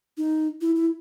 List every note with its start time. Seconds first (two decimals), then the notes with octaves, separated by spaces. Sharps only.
0.17 D#4
0.61 E4
0.76 E4